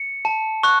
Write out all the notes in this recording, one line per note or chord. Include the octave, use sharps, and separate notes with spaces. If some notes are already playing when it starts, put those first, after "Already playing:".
Already playing: C#7
A5
C#6 F#6